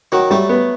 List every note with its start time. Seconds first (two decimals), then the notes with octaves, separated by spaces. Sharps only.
0.12 D#3 F#3 F#4
0.30 F#3 G3 A3
0.49 B3